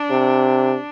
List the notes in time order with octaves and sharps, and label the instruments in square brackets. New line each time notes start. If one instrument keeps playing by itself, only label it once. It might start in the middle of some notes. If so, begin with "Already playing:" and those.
Already playing: [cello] D4
[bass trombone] C3